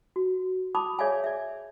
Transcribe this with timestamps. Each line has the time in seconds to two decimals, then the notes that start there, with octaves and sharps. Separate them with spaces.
0.16 F#4
0.75 A5 B5 D6 D#6
0.99 G#4 C#5 D5 E5 F5 G#5
1.24 D5 E5